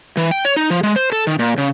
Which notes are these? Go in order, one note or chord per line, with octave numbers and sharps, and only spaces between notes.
E3
G5
C#5
D#4
F3
G#3
C5
A4
D#3
A#2
C#3